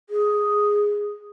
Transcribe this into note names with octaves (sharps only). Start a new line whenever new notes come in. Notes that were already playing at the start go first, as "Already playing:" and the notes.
G#4